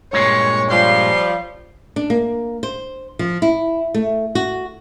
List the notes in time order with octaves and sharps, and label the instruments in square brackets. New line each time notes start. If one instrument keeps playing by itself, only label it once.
[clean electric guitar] G2 A#2 G#3 [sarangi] C#5
[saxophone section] F3 G3 [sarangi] C6
[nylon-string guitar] D4
A#3
C5
F3
E4
A3
F#4